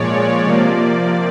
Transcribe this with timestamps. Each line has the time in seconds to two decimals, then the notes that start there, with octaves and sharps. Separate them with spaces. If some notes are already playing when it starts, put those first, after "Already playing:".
Already playing: A#2 F3 G#3 C#5 D5
0.45 C3 F3 A#3